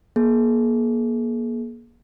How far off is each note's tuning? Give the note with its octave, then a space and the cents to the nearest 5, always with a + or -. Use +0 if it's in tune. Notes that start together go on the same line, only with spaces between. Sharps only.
A#3 +30 G#4 +35